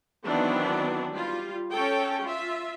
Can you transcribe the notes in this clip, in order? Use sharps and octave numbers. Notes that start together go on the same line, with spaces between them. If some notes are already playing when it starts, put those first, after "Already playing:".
D#3 E3 F#3 B3 C4 D4
G3 F4
C#4 A4 C#5 G5
F4 E5